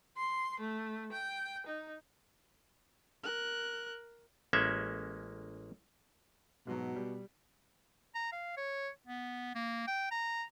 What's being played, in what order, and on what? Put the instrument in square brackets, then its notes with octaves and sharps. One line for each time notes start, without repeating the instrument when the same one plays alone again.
[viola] C6
A3
G5
D#4
[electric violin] A#4 F#6
[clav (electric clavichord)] A1 G#3 A#3 C#4 E5
[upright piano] G#2 F#3 [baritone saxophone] B2
[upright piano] G3
[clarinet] A#5
F5
C#5
B3
A#3
G5
A#5